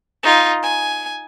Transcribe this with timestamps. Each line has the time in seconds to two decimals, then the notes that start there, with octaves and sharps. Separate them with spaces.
0.23 D#4 F4
0.63 G#5